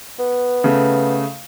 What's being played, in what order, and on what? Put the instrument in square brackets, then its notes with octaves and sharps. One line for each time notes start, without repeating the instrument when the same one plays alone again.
[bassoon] B3
[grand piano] C#3 A3